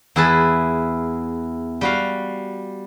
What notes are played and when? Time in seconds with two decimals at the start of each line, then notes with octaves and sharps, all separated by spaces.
0.16 E2 E4 G#4 B4 A5
1.81 G3 F#4 F5